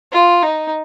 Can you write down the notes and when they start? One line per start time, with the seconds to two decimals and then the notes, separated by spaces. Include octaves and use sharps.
0.12 F4
0.42 D#4